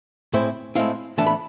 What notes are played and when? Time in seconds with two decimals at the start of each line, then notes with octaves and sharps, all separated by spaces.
0.33 A2 G#3 C4 E4 C5
0.75 A2 G#3 C4 E4 F5
1.18 A2 E3 B3 D4 A5
1.26 B5